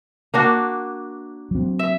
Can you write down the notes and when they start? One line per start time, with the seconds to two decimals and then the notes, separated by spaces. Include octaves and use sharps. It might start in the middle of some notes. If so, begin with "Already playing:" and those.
0.34 A#3 D4 F#4
1.51 F#3 C4
1.79 E5